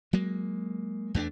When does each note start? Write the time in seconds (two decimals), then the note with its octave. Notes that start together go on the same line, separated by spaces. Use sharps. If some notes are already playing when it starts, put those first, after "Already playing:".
0.13 F#3 G#3 A#3
1.14 E2 A3 C4 D4